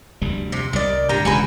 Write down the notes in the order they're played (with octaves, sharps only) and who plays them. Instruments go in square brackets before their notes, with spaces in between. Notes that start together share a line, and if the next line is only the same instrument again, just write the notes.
[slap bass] F1 D2 G3
[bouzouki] C3
[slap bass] C2 G3 [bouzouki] D#3 D5
[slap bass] G#2 D3 [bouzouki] G4 A#5
[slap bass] E1 C#2 D3 [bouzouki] F#4 G#4 B4